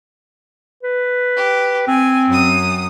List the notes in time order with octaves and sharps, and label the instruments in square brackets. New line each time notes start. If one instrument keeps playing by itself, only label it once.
[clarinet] B4
[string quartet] G4
[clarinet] C4 [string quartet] G#5
[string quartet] F#2 D#6